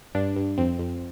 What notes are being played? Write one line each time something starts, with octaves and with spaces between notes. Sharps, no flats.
G2 D4
G2
F2 C4
F2